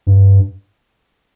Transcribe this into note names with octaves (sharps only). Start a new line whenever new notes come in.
G2